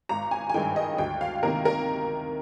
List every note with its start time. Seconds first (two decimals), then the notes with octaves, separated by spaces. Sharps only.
0.09 G#1 A#5
0.31 G#5
0.49 G#5
0.54 G2 D#3 G#3 G5
0.76 D#5
0.98 D2 G5
1.21 F5
1.43 C3 D#3 A#3 A#4
1.65 A#4